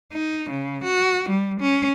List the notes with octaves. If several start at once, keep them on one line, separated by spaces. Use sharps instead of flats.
D#4
C#3
F#4
G3
C#4